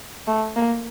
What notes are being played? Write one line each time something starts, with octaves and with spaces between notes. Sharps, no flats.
A3
A#3